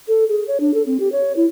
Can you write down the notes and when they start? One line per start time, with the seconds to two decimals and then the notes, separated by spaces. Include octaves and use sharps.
0.08 A4
0.29 G#4
0.48 C#5
0.60 D4
0.74 A4
0.86 C4
1.00 G4
1.12 C#5
1.36 E4